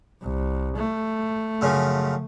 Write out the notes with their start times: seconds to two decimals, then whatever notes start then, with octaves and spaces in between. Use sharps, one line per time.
0.22 C2
0.76 A3
1.61 F#2 C#3 F3